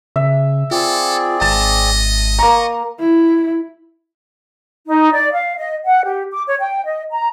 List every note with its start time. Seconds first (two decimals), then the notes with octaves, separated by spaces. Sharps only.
0.16 C#3 E5
0.71 C4 F4 G#4 A4 D5
1.41 G#1 D#5 A5
2.39 A#3 A#5 C#6
3.00 E4
4.87 D#4
5.13 D5
5.32 F5
5.57 D#5
5.85 F#5
6.04 G4
6.31 D6
6.46 C#5
6.60 G5
6.85 D#5
7.11 A#5